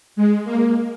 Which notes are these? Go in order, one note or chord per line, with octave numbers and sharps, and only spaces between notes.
G#3
A#3